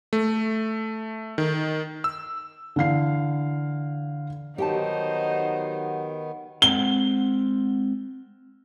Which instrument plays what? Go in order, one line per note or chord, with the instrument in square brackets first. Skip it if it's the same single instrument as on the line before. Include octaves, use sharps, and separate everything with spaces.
[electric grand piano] A3
D#3
E6
[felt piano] D3 E3 F5 C7
[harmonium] D#3 B3 [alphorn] F#3 [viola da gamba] D#4 C5 [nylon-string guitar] G4 G5 A5
[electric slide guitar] G#3 C4 F#5 [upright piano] G7